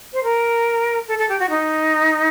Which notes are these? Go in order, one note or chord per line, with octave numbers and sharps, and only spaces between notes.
C5
A#4
A4
A4
G4
F#4
D#4